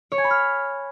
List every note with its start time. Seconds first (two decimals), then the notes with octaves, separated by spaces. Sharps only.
0.12 C#5
0.18 G#5
0.24 B5
0.30 F6